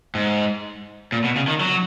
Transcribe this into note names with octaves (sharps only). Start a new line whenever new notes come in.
G#2
A#2
B2
C#3
D#3
F#3